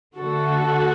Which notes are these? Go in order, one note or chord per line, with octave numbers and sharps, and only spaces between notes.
D3 A3 F#4 A4